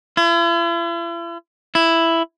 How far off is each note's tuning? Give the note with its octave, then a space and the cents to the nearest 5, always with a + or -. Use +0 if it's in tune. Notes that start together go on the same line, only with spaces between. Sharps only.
E4 +45
E4 +5